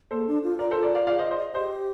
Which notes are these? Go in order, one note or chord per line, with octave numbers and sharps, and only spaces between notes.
A#3 A4 C5
D4
F4
F4 A#4 D5
A4 C5
A#4 D5
D5 F5
D5 F5
C5 D#5
C5 D#5
G4 C5 D#5